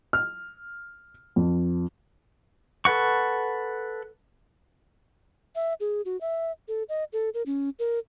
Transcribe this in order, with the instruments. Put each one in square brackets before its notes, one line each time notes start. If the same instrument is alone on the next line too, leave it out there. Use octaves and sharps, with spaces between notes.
[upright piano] F6
F2
[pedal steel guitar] A4 B4 F#5 C#6
[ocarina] E5
G#4
F#4
E5
A4
D#5
A4
A#4
C#4
A#4